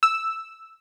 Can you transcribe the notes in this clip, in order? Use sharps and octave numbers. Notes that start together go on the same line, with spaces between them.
E6